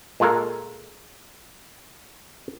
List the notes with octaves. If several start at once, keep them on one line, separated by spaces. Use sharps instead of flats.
A#2 G#3 F4 A4 A#4